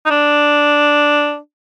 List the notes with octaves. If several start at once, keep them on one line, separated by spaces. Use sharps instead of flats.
D#4
D4